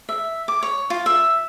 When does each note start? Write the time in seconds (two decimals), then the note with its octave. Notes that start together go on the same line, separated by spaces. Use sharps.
0.09 E5
0.48 D6
0.63 C#5
0.90 F4
1.06 E5